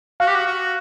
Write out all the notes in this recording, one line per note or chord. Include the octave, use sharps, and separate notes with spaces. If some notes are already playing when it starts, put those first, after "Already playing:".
F#4 F5
G4
F#4
F#4